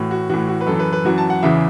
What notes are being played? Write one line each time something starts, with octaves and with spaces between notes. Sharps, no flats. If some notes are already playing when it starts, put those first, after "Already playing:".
Already playing: A2 E3 F#4
F#4
A2 E3 F#4
F#4
B4
F#2 E3 A4
B4
B4
F#2 E3 F#4
A5
F#5
E2 C#3 E3 E5